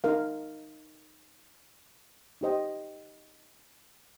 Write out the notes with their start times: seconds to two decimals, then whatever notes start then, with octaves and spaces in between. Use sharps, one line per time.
0.04 D#4 A#4 F5
2.41 D#4 G4 C5 D#5 G5